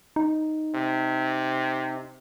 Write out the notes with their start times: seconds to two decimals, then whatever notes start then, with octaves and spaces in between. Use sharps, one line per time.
0.16 D#4
0.75 C3